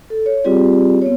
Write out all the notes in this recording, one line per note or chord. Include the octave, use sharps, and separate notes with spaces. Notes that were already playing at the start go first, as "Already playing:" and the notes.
A4
C#5
G3 C4 F4 G4 G#4 D5
B3 C#5